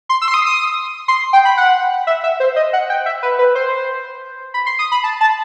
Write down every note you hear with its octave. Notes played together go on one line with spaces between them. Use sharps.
C6
E6
C6
D#6
D#6
C6
G5
B5
F#5
E5
E5
C5
D#5
F#5
G5
E5
B4
B4
C5
B5
C6
D#6
B5
A5
A5